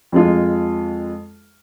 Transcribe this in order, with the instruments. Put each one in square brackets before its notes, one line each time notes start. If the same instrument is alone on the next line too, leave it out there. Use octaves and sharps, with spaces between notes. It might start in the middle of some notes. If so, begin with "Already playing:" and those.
[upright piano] F2 G#3 F4